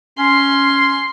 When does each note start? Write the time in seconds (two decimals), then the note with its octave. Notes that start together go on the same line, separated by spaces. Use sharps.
0.19 C#4 C6